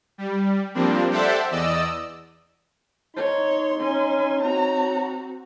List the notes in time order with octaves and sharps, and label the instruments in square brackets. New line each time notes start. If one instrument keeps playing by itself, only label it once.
[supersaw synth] G3
F3 G3 A#3 C4 D4
G4 A4 C5 D5 E5 F#5
E2 D5 D#5 E6
[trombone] D#4 [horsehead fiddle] C#5 [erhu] C6
[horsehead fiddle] C#4 G#5 [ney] C#5
[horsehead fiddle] C4 F#4 [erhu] A#5